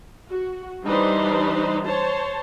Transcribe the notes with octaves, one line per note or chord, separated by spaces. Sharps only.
F#4
E3 G3 D4 D#4 B4 C5
C5 C#5 A5